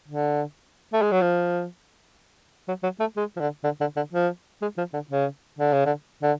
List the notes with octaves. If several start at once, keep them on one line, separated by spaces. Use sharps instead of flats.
D3
A3
G#3
F#3
F3
F#3
F#3
A3
G#3
F3
D3
D3
D3
D3
F3
G#3
F3
D3
C#3
D3
C#3
D3
D3